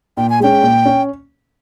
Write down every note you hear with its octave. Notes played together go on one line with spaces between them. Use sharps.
A#2 G5
G#5
G#3 C#4 G5
A#2
C#4